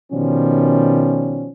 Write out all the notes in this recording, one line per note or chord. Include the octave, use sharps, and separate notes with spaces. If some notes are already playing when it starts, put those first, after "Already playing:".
B2 D#3 F3 G3 C#4